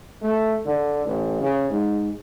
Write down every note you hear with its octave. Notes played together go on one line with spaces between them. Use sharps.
A3
D3
A1
C#3
G#2